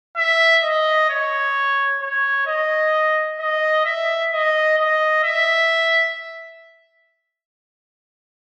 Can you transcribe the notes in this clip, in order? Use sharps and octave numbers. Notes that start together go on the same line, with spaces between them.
E5
D#5
C#5
C#5
D#5
D#5
E5
D#5
D#5
E5